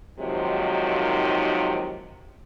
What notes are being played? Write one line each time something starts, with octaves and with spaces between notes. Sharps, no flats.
D#2 C3 D#3 F3 F#3 G#3